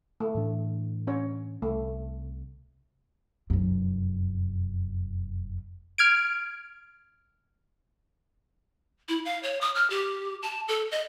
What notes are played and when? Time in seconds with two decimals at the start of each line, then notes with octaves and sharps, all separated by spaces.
0.20 A3
0.35 A2 E3 D4
1.07 C#4 C#5
1.62 C2 A3
3.50 F1 F#2
5.98 F6 G#6 D7
9.09 E4
9.25 F5
9.43 C#5
9.61 D#6
9.75 F6
9.90 G4
10.42 A5
10.68 A4
10.91 D#5